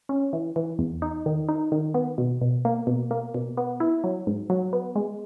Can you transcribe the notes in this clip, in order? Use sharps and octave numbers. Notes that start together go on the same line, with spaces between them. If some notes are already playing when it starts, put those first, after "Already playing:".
C#4
E3
E3
E2
D#4
D#3
D#4
D#3
B3
B2
B2
A#3
B2
A#3
B2
B3
E4
F#3
G#2
F#3
B3
G#3